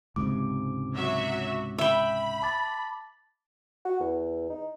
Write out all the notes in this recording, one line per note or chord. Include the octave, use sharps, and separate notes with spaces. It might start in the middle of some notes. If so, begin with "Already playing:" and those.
C#2 G#2 C3 D6
F#3 F#4 E5
E5 G5 B5
A5 D6 A6
F#4
E2
D#4